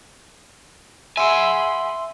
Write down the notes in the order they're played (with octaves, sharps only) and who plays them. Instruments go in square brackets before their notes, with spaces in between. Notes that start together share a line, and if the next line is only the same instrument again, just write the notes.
[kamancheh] G#4 B5 [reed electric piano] E5 E6 [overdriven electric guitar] F#5 G#5 [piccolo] C6